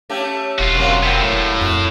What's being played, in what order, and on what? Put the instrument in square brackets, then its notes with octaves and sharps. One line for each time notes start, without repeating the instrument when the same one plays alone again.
[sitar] A3 C#4 G4
[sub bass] E1 [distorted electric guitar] F4 F#4
[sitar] F#2 C3 A#3
[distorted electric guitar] B3 C4
A2
[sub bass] F2 [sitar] F#4